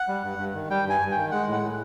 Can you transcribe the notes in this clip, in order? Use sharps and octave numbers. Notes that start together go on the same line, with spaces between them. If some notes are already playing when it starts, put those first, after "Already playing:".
Already playing: F#5
G3
G2
G2
D#3
G3 G5
G2 G#5
G2
G5
D#3
G#3 F#5
A2
F#5
A2